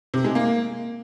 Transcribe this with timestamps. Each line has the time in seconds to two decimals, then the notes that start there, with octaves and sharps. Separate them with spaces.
0.14 C3
0.24 G#3
0.35 A#3